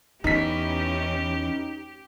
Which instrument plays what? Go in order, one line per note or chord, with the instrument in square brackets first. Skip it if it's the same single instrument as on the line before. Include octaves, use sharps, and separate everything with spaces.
[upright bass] E2 [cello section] E3 C#4 [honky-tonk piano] D#4 B6 [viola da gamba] G4